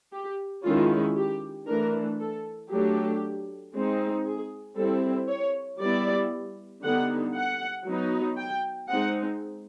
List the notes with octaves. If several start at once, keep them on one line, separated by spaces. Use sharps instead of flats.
G4
D#3 G#3 C#4 E4 F4
G4
E3 A3 D4 A#4
A4
F#3 A3 D4 G4
G#3 C4 D#4
G#4
G3 C4 E4 A4
C#5
G3 B3 E4 D5
D3 G3 B3 D#4 F#5
F#5
F#3 B3 D#4
G5
G#3 C4 D#4 F#5